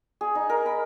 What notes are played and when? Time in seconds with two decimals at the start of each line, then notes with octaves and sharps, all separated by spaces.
0.21 G#4
0.35 D#4
0.49 A#4
0.66 B5